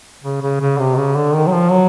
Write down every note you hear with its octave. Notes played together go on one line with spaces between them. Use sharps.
C#3
C#3
C#3
C3
C#3
D3
D#3
F#3
F3
F#3